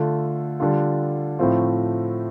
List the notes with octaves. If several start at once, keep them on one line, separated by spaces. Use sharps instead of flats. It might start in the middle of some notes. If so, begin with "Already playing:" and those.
Already playing: D3 A3 F4
D3 G3 D4 F4
A2 F3 A3 C4 F4